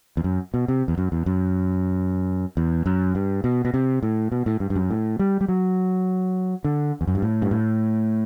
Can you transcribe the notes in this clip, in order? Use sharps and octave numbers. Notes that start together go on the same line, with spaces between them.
E2
F#2
B2
C3
E2
F#2
E2
F#2
E2
F#2
G2
B2
B2
C3
A2
B2
A2
G2
G2
F#2
A2
G3
G3
F#3
D3
E2
F#2
G2
A2
G2
A2